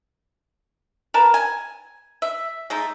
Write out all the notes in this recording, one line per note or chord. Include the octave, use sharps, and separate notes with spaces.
A#4 B4 A5
G#5
E5
G#3 A3 D#4